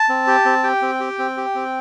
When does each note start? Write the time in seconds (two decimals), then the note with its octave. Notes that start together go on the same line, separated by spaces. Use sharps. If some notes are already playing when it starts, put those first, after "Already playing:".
Already playing: A5
0.09 C4
0.27 G4
0.45 C4
0.63 G4 G5
0.82 C4
1.00 G4
1.19 C4
1.37 G4
1.55 C4